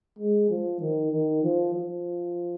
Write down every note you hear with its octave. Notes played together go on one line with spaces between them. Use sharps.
G#3
F3
D#3
D#3
F3
F3